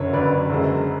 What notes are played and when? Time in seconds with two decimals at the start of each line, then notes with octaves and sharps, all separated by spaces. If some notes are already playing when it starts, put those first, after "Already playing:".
Already playing: F#1 F#2 D3 A4 C#5
0.13 F#1 F#2 D3 B4 D5
0.49 F#1 F#2 D3 G#3